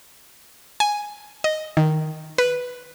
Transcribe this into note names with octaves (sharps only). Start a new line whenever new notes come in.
G#5
D#5
D#3
B4